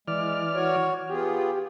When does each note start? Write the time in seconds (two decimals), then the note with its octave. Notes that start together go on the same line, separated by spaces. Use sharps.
0.08 E3 G#3 D5 F6
0.54 F#4 C#5
1.10 B3 F4 G4 G#4